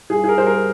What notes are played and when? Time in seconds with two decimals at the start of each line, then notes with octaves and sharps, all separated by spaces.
0.10 G2 G#4
0.24 G#4
0.28 A#4
0.37 G3 C5
0.46 A#4